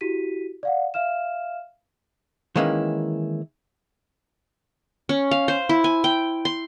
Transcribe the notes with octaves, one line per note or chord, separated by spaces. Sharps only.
E4 F#4 G4 B6 D#7
D5 F5 F#5
E5 F5 F6 E7
D#3 E3 G#3 A#3 C#4 E4
C#4
F5
C5
E4
G#5
G5
C6